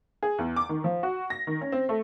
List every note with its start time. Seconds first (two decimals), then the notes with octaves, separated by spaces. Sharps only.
0.23 G#4
0.39 E2
0.56 D6
0.69 D#3
0.84 F3
1.03 F#4
1.30 A#6
1.47 D#3
1.61 C#4
1.72 C4
1.89 A3